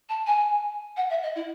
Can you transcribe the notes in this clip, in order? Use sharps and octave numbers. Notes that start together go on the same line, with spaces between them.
A5
G#5
F#5
E5
D#5
E4